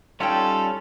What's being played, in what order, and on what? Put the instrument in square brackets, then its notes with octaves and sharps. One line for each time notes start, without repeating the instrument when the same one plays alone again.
[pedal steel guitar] G3 C#4 F4 [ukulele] D#4 C#5 G5 [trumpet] A4